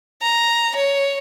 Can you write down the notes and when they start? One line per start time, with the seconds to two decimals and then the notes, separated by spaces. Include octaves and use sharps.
0.22 A#5
0.76 C#5